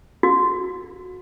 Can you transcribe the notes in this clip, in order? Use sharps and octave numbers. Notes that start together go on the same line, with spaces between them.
F#4